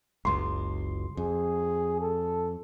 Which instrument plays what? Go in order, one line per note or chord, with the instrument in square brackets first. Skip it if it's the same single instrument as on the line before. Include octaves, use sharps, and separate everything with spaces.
[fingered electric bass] F#1 C#2 [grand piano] C6
[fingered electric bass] F2 [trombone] G#4
[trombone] A4